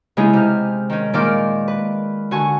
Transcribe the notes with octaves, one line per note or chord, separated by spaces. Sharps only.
C#3 G#3 B3 D#4 E4 G#4
C3 F6
D#3 C#4
A#2 D#3 G#3 D5 D6 F6
B4
D3 F#4 G#5 C#6